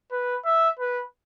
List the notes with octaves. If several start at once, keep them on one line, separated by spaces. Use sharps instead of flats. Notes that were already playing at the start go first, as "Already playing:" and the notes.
B4
E5
B4